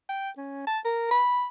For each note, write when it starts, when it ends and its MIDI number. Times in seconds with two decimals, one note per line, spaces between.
0.09 0.30 79
0.37 0.63 61
0.67 0.79 81
0.85 1.10 70
1.11 1.47 83